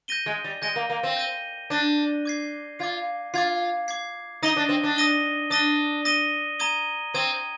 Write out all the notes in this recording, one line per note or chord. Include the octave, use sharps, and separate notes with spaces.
G6 A#6 D#7 G7
G#3
G3
G#3 G6 A#6 D#7 G7
A#3
A#3
C4
G6 A#6 D#7 G7
D4 G6 A#6 D#7 G7
D6 G#6 C7
F4 D6 G#6 C7
F4 D6 G#6 C7
D6 G#6 C7
D#4 D#6 A#6 D#7 G7
D4
C4
D4
D#6 A#6 D#7 G7
D4 D#6 A#6 D#7 G7
D#6 A#6 D#7 G7
A#5 D#6 G#6 D#7 G7
C4 A#5 D#6 G#6 D#7 G7